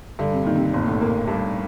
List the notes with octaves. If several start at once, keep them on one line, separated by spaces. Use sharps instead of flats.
G2 D3
C3
A#2 D#3
C3
G1 A#2
A2
A#2 A#3
G2